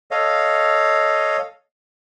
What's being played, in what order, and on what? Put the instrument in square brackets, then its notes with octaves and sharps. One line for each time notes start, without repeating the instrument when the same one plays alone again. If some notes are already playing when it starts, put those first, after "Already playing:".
[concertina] A4 C#5 D#5 F5